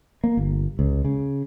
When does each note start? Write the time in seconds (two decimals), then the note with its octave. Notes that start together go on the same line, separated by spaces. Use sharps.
0.24 A#3
0.37 G1
0.79 C#2
1.05 C#3